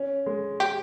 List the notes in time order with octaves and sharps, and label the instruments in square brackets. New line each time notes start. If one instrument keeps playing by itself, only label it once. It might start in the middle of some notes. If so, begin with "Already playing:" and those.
Already playing: [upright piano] C#4
G#3
[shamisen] G4